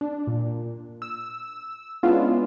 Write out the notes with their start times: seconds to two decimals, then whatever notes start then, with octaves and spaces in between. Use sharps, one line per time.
0.01 D4
0.27 A#2
1.02 E6
2.03 G#3 B3 C#4 D4 E4 F4